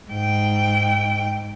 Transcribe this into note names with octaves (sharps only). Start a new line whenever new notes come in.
G#2 G5